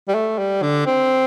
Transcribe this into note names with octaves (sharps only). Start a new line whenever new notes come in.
G3
A3
G3
D3
C4